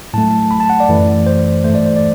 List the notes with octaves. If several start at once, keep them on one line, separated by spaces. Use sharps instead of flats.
A2 F#3 A3 A5
B5
A5
F#5
D5
F#2 E3 A3
C5
G2 E3 A3 C5
D5
C5
D5